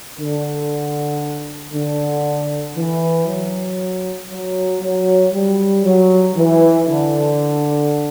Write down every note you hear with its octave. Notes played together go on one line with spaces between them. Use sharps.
D3
D3
E3
F#3
F#3
F#3
G3
F#3
E3
D3